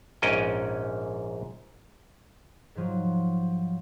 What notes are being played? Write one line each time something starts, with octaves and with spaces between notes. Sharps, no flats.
A#1 G#2 C#4 D#5 G5
G#2 F3 F#3